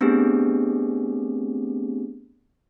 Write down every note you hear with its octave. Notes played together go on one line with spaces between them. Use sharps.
A3 B3 C4 D4 G4 G#4